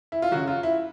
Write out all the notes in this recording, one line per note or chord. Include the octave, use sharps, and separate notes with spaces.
E4
F4
F#2 C#3 F#3 F#4
F4
E4